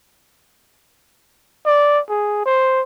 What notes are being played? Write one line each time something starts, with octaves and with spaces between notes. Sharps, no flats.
D5
G#4
C5